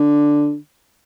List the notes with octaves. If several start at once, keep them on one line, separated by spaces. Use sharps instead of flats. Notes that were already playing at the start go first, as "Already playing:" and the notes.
Already playing: D3